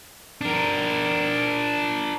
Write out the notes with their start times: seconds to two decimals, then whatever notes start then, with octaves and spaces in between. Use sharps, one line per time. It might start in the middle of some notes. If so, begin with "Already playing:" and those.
0.41 D4 A#4